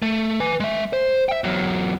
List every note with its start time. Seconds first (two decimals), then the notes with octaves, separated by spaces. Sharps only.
0.02 A3
0.40 B4 G#5
0.60 G#3 E5
0.93 C5
1.29 E5 G5
1.44 E2 F#3